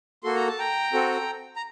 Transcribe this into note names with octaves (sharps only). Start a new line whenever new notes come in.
A#3 F#4 A4 C6
A#5
A5
G5 A#5
C4 F#4 A4
A#5